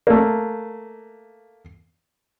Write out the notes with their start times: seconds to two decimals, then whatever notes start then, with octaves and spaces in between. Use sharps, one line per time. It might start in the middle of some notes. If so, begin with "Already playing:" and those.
0.07 A3 A#3